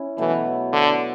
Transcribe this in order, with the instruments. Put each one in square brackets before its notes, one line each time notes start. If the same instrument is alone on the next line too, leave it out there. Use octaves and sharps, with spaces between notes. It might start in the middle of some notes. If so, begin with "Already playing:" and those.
Already playing: [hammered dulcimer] C#4 E4
[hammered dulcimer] B2 F#3 A3 [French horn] E3
[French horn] D3